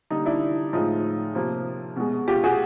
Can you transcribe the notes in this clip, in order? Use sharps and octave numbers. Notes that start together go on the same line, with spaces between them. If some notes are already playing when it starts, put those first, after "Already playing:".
D3 G3 A#3 D#4
D4 E4
A2 F3 G#3 D#4 F4
C3 F3 A#3
B2 G#3
F4 G4
F#4 G#4